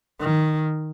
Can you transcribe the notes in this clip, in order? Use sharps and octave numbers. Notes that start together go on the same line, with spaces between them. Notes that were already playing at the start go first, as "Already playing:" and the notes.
D#3